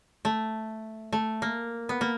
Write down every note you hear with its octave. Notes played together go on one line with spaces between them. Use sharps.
A3
A3
A#3
B3
A#3